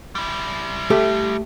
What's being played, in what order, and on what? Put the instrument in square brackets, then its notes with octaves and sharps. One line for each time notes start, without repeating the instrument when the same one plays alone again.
[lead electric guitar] G3 E4
[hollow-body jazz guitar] A3 G4 A4